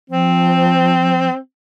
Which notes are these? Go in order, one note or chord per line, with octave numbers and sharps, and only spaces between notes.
F3 C4